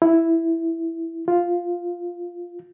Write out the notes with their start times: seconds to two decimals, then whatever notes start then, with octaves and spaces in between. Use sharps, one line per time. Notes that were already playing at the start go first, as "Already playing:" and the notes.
0.02 E4
1.28 F4